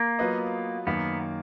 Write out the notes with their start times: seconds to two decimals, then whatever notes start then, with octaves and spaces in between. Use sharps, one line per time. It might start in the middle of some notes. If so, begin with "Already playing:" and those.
Already playing: A#3
0.19 F#3 B3 F4 B4 D#5
0.86 F#2 D#3 A#3 B3